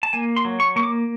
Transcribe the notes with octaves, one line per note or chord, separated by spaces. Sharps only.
A5
A#3 G#5
C6
F#3
C#6
A#3 C#6
D6